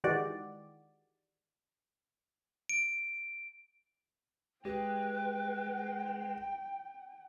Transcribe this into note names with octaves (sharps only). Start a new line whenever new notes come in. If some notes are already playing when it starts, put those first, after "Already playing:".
D#3 E3 G#3 F#4 G4 D5
D7
G#3 G4 B4 G5